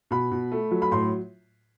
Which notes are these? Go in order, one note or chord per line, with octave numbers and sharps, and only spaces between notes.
B2 B5
B2
A3
F#3
B5
A2 C6